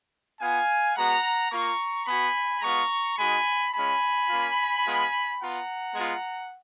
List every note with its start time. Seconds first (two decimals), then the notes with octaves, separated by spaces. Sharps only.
0.39 B3 F4 F5 G#5
0.95 G#3 B3 F#4 F#5 A#5
1.51 A#3 F4 A#5 C#6
2.06 B3 F#4 G#5 B5
2.62 G#3 B3 F4 A#5 C#6
3.17 G#3 D#4 F#4 G#5 B5
3.73 G#3 C#4 F4 G#5 B5
4.28 A#3 C#4 F4
4.84 G#3 B3 F4
5.40 B3 F4 F#5 A#5
5.95 G#3 B3 F4